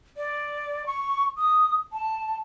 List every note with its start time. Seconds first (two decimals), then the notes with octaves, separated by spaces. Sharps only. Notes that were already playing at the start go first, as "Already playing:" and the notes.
0.17 D5
0.86 C#6
1.37 D#6
1.93 A5